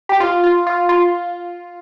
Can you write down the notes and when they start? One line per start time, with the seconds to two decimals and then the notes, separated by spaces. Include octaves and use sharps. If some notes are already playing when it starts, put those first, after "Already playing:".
0.09 G4
0.20 F4
0.44 F4
0.67 F4
0.89 F4